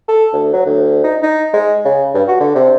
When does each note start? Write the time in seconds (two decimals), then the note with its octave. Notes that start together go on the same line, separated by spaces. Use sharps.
0.08 A4
0.33 D2
0.53 F#3
0.66 D2
1.04 D#4
1.23 D#4
1.53 G#3
1.85 C#3
2.15 G2
2.28 F#4
2.40 D3
2.55 C3